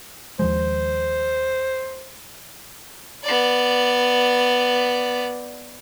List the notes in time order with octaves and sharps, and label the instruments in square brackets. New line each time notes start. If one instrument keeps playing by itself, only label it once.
[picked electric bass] D#2 F3 G#3 [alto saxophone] C5
[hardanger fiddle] B3 D5